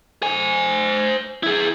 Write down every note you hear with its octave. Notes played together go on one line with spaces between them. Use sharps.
C5 G#5
E4 G#4